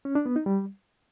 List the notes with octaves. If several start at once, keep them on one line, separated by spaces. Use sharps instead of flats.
C#4
D4
B3
D#4
G3